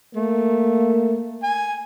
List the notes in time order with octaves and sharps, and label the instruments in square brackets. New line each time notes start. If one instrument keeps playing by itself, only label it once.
[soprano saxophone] A3 [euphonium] A#3
[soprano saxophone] G#5